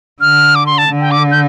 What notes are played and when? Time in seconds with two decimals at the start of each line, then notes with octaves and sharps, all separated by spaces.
0.21 D3 F6
0.55 D6
0.66 C6
0.78 A5
0.89 D3
1.01 G5
1.11 D6
1.31 G6